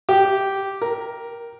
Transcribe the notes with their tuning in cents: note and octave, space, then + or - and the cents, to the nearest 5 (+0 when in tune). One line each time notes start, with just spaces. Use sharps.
G4 -5
A#4 +10